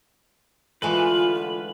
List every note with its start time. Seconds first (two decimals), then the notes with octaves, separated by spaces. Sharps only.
0.82 D3 E3 G#3 A3 F4 B4